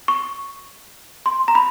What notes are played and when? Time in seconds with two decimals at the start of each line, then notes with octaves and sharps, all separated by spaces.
0.08 C#6
1.26 C6
1.48 A#5
1.55 B5